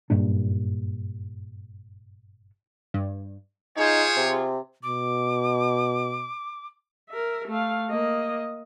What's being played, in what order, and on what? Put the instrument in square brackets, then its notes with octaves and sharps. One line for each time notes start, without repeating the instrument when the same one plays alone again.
[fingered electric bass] F#1 G2 A#2 D4
[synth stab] G2
[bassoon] D#4 [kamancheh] F4 G#4 [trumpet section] C5 C#5
[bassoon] C3
[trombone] B2 [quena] D6
[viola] A#4 E5
A3 F5
A#3 D#5